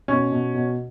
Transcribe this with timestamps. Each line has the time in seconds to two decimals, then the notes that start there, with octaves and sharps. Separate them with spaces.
0.08 B2 C#4
0.32 B2
0.54 B2